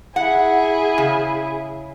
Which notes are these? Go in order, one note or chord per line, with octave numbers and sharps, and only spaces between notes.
E4 G#4 F#5
C#3